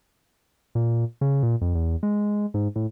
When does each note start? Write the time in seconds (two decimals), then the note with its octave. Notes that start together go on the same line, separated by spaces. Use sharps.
0.75 A#2
1.21 C#3
1.43 A#2
1.62 F2
1.75 E2
2.03 G#3
2.54 G#2
2.76 A2